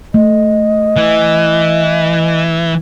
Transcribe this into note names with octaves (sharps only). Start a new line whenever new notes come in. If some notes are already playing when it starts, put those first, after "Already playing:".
A3 D#5
E3